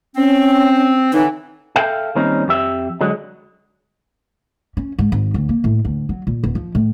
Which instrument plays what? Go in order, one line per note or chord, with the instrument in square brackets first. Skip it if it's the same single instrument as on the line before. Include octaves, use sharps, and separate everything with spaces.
[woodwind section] C4 [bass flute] C#4
[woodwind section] A2 D3 E3 [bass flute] D#4
[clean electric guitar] A4 E5 F5 G5
D#3 G3 A#3 C4 C#4 D#4
F2 G4 E5
D3 F#3 G#3
[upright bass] C#4
G#2
G#1
D2
A#3
A2
D2
F#3
A#2
D#1
F3
A2